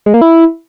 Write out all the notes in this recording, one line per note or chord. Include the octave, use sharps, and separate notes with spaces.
G#3
A#3
E4